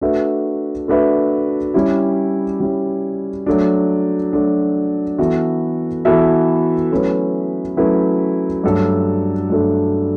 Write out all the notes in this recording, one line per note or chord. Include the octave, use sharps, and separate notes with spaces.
A3 D4 F#4 B4 E5
A3 D4 F#4 B4 E5
G3 C#4 E4 G4
G3 C#4 E4 G4
F#3 A3 D4
F#3 A3 D4
E3 B3 F#4 A4 E5
E3 B3 F#4 A4 E5
F#3 A3 C#4 E4 B4
F#3 A3 C#4 E4 B4
G2 F#3 A3 D4 A4
G2 F#3 A3 D4 A4